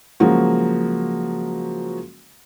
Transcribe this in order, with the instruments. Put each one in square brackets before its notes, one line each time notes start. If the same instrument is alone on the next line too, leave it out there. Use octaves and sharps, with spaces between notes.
[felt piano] C#3 F3 F#3 G#3 A#3 F#4